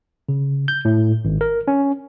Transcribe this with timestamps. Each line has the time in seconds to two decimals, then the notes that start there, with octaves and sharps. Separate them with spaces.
0.29 C#3
0.68 G6
0.85 A2
1.25 G#1
1.41 A#4
1.68 C#4